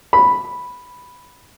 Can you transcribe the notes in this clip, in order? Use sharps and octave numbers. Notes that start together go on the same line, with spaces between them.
B5